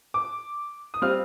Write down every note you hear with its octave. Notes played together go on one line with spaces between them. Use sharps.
D6
D#6
G3 C4 F4 F6